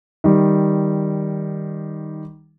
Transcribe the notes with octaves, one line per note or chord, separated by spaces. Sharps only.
D#3 G3